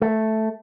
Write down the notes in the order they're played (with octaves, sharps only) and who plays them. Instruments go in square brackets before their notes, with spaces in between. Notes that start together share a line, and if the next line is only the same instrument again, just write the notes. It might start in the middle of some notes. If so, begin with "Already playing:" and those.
[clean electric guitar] A3